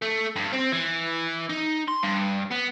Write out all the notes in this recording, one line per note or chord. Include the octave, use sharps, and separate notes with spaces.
A3
G2
C4
E3
D#4
C6
G2
B3